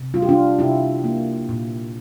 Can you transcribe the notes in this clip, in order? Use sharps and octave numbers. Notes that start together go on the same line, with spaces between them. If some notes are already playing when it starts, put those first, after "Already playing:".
Already playing: C3
G3 F4
G4
D4 F4
C3 E4 G4
A#3
A#2